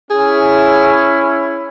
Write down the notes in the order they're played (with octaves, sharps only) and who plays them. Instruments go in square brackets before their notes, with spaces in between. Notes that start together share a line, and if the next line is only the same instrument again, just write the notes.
[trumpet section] C#4 E4 [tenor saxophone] G#4